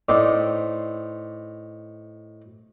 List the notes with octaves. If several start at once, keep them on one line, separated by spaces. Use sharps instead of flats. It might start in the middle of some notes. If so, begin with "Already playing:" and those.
A2 C4 D#4 D5 C6